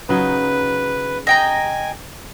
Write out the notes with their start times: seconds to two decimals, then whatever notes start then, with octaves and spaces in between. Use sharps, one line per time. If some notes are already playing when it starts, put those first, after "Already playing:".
0.09 C#3 F#3 D#4 B4
1.27 D#5 G5 G#5 A#5